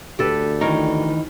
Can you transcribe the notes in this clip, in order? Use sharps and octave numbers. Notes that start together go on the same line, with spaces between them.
D2 G4 A4 B4
D#3 E3 D#4 A#4 C#5